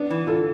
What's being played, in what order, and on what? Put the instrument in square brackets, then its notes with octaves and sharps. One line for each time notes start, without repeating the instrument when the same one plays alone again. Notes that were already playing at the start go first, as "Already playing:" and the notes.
Already playing: [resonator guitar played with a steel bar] B3 [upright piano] D4
[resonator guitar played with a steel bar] E3
[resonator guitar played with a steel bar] E3 [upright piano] F4 A4